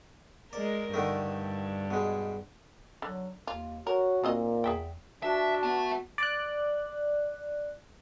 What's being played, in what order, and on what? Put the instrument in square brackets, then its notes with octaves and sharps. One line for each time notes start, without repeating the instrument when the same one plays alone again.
[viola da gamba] G#3 A#4 [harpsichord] D5
[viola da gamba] G2 [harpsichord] D3 D#3 A3
[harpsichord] B2 G#3
[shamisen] D3 [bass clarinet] F#3
[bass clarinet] D#2 [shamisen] F4
[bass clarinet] F#4 [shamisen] A#4 [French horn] C#5
[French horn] A#2 [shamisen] D#3 C4 D#5
[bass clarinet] E2 [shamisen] G#4 E5 G5
[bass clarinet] D4 [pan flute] F#4 [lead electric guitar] E5 [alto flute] A5
[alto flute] B3 [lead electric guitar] E5 A5
[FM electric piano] D5 F#6